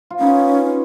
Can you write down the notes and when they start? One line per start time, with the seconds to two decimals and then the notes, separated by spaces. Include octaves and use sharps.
0.10 F4
0.20 B3 C#4 D#4